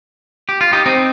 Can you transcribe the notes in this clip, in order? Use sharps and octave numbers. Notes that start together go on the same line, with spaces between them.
G4
F4
D#4 G4
C4 D#4